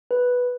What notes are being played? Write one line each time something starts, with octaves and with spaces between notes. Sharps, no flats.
B4